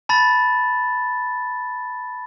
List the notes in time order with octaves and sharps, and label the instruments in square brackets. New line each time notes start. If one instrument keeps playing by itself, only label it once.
[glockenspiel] A5 B5 A6